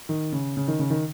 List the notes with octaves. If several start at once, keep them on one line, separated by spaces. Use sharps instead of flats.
D#3
C#3
C#3
D#3
C#3
D#3